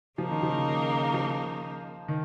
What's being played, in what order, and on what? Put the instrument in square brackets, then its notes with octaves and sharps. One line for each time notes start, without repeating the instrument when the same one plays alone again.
[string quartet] C#3 A#3 D#4 [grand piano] F3
[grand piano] D#3
F3
F3
D#3